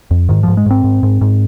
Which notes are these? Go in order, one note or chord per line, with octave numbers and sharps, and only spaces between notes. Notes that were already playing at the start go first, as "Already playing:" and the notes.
F2
G#2 D#3
G#2 F3
G#3
G#2 C4
G#2
G#2
G#2